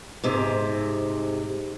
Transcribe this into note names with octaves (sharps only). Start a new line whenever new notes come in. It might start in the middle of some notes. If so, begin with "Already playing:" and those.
G#2 C3